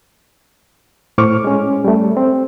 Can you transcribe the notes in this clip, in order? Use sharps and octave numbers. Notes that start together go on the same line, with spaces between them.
A2 C5 C#6 D6 F6
G#3 C#4
G3 A3
C4